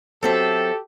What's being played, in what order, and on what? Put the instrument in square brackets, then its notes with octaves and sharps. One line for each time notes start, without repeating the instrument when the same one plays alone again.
[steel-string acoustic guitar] F#3 C4 E5 [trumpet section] G4 A4